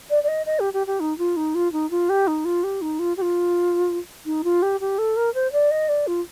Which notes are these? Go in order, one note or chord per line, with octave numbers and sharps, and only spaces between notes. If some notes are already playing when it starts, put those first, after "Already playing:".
D5
D5
D#5
D#5
G4
G4
G4
D#4
F4
D#4
F4
D#4
F4
G4
D#4
F4
G4
D#4
F4
G4
F4
D#4
F4
G4
G4
A4
A#4
C5
D5
D#5
D5
F4